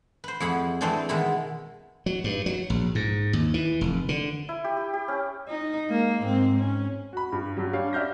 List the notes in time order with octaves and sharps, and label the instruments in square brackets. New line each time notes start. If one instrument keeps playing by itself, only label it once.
[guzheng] B4 C5
F2 E4 G#4 F#5 B5
E3 A3 C4 D4 G#4
B2 D#3 G#3 E4 B5
[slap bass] F#3
G2
F#3
A#1
G#2
D#2
E3
F1
D3
[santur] E4
G4
G4
G4
C#4
[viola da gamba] D#4
G#3 A#3
G#2 C4
C#4
[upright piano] F#4 B5
G2
G2 F#3
G3 D4 C#5 F5
D5 E5 F6 G6 A#6